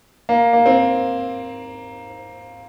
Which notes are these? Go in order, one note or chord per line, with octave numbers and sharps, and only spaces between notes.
A#3
A#3
C4